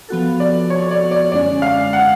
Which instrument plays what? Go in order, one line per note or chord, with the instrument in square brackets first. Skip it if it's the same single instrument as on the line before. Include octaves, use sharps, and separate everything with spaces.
[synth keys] F3 B3 F#4 A4
[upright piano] D5
C#5
D5
D5
[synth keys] F#2 D3 G#3 C#4 [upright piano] D5
[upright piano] F5
F#5